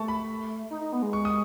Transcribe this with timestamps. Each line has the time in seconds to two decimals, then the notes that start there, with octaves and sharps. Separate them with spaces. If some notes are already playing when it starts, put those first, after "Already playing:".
Already playing: A3 A5 C#6
0.08 B5
0.71 D#4
0.81 D#4
0.93 B3
1.02 G#3
1.13 C#6
1.25 D#6